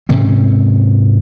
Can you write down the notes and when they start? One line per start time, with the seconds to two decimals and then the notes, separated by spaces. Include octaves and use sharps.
0.09 G#2 C3 C4 C#4